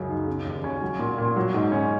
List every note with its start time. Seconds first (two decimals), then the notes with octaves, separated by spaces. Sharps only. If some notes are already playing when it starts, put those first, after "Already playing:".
Already playing: C#2 F#2 C#3
0.09 D#4
0.27 C#3
0.45 D#2
0.64 C#4
0.82 F#3
0.99 A#2
1.18 A#2
1.36 F#3
1.54 G#2
1.72 C#4